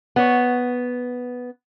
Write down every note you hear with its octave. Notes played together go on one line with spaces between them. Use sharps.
B3 C#5